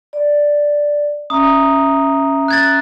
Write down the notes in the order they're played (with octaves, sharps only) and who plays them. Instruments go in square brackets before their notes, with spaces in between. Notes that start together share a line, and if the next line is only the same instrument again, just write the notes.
[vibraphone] D5
[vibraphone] C#4 E5 A#5 [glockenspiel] D#6
[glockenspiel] F#6 G#6 A6